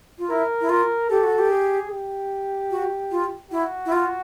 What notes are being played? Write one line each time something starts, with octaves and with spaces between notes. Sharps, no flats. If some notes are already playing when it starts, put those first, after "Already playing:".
F4
E4 A#4
E4
F4 A#4
G4 A4
F#4
G4
G#4
G4
F#4
F4
E4 F#4
E4
F4